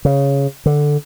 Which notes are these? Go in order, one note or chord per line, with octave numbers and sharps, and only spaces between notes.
C#3
D3